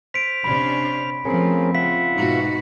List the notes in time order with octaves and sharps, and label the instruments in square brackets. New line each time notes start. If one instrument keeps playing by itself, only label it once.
[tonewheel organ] C5 F6 [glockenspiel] B6 D7
[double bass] C3 [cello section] C#4 D4 [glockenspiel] B5
[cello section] F3 A3 [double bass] C4 [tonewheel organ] C#4 G#4 A#4
[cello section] C#3 [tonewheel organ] F4 E5 F#5 [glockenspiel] B6
[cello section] G#2 B2 F#4 [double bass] D#4